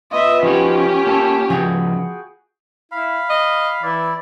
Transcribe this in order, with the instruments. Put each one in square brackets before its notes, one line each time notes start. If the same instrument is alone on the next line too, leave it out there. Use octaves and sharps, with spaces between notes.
[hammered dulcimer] B3 F4 [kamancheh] D#5 E5
[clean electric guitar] F3 D#4 F#4 [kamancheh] C#4 G4
[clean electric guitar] A#3 A4
[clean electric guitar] C#3 F3 G#5 [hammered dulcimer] F#4 G#4 G5
[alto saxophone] E4 [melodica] F5 B5
[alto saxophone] D#5
[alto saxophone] E3 [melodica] E4 D5